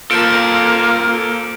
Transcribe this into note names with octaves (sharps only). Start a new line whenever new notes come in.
A#3 F4 A4 C5 A5 D7